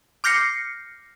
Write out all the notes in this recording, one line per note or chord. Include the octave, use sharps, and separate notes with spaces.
D6 F6 G6 A#6 C7 C#7